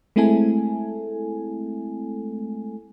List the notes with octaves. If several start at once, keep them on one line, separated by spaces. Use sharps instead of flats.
G#3 A3 C4 E4 A4 G#5